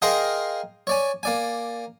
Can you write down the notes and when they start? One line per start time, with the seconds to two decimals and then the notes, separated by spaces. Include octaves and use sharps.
0.02 G#4 A#4 D#5 F5 G5 C6
0.87 C#5 D5 G#5
1.23 A#3 D5 G#5